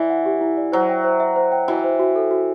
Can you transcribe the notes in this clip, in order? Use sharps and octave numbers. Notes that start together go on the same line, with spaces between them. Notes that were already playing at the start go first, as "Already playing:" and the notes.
Already playing: E3 E4 D5
F#5
G4
E4
D5
F#3 C5
G5
C5
E5
C5
G5
E3 F#4
C5
F#4
A4
F#4